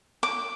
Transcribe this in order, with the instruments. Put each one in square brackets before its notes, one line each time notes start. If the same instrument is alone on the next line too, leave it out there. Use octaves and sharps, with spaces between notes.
[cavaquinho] D6